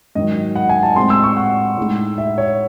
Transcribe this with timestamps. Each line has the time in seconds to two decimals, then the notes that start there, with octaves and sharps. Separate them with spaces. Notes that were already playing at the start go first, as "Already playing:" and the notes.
0.15 G#2 D#3 F#3 D#5
0.55 F#5
0.69 G#5
0.83 A5
0.96 A2 G#3 C4 C6
1.10 E6
1.24 C#6
1.37 F#5
1.77 A2 G#3 D#4
2.18 E5
2.38 C#5